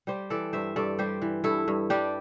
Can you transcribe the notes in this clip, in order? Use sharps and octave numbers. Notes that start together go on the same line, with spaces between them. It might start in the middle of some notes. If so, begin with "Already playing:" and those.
G3 G4 C5
E3 A4 D5
G2 C5 E5
G2 A4 D5
G3 G4 C5
E3
G2 E4 A4
G2
G3 D4 G4